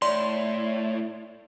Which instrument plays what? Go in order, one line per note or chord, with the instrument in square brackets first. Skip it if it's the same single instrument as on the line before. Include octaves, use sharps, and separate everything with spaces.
[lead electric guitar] A2 [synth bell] D5 C6